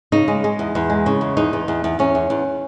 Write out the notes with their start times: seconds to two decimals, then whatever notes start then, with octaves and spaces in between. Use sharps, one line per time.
0.12 C#3 D#4
0.28 G#3
0.44 G#3
0.59 E2
0.75 E2
0.90 G#3
1.06 C#3
1.21 E2
1.37 E2 D#4
1.53 E2
1.68 E2
1.84 E2
1.99 E2 C#4
2.15 E2
2.30 E2